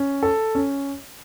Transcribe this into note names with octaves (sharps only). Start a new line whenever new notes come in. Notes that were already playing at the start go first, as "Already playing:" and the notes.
Already playing: C#4
A4
C#4